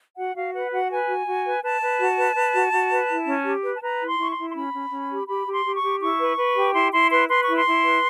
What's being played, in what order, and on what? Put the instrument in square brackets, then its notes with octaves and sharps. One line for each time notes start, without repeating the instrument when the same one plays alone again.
[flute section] F#4 F#5
F#4 F5
B4 F#5
F#4 F#5
B4 G#5
F#4
F#4
B4
B4 A5
B4
F#4
B4
B4
F#4
F#4
B4
E4
C#4
G4
B4
A5
B4 A#5
E4
C6
E4 C#6
C6
E4
C6
C#4 B5
C#4
C#4
G4
G4 B5
G4
C6
G4
C#6
G4
E4 C#6
B4
B4
G4
E4 C6
E4 C6
B4 C6
B4 C6
C#6
E4
C6
E4
B4